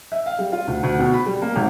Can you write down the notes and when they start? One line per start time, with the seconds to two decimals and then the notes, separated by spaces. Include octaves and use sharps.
0.12 E5
0.26 F5
0.39 G3
0.52 F4
0.67 D2
0.83 D2
0.99 B2
1.13 B5
1.26 G3
1.42 A#3
1.56 G#1